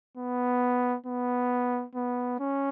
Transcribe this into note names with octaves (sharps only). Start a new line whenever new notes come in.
B3
B3
B3
C#4